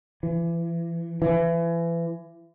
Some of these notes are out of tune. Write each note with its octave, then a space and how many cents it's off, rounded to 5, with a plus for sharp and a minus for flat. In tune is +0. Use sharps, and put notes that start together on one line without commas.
E3 +35
E3 +30